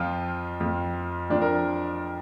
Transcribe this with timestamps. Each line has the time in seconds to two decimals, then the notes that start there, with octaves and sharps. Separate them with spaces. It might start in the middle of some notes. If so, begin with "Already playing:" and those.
Already playing: F2 F3 F4
0.60 F2 F3
1.30 F2 F3 D4
1.42 A#4